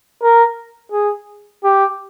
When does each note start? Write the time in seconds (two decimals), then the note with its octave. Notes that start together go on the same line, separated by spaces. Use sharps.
0.22 A#4
0.92 G#4
1.64 G4